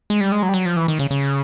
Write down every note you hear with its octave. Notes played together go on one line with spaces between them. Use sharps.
G#3
G3
G#3
F#3
G3
F#3
F3
E3
D#3
C#3
C#3